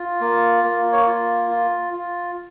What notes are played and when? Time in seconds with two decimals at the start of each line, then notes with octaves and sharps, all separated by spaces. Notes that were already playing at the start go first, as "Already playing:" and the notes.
Already playing: F4
0.21 A#3
0.64 A#3
0.93 C#5
1.07 F4
1.50 F4
1.93 F4